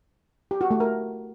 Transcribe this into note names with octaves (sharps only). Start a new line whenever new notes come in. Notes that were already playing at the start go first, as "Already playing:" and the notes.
G4
F#4
A3
A#4